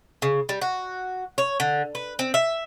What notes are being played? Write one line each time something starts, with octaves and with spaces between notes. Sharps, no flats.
C#3
G3
F#4
C#5
D3
B4
C4
E5